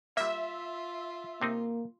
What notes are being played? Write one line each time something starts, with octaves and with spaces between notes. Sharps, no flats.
G3 A#3 F4 E5
C3 A#3 C4 D#4